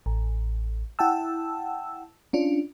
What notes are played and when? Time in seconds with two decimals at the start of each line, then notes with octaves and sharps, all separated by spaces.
0.06 A1
0.99 E4 F#5 G5 A5 E6
2.33 C#4 D4 F4